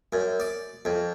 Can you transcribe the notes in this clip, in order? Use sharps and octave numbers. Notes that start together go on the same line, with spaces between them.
F#2
D5
F2